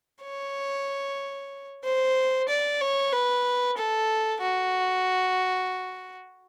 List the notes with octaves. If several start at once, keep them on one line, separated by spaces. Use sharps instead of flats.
C#5
C5
D5
C#5
B4
A4
F#4